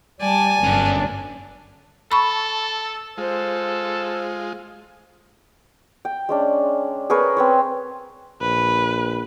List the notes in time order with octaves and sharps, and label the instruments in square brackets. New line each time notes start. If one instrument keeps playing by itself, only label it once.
[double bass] G3 [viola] D5 A5 [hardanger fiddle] G#5
[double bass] G1 [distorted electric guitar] F#2 C#4 [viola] D4
[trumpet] A4 [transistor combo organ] A5 [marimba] B5 C#6
[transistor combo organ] G#3 F4 [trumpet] A4 [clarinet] C5
[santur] G5
G#3 C#4 D4
G#4 A#4 B4 C#5
C4 B4 C#5
[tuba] A#1 [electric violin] B4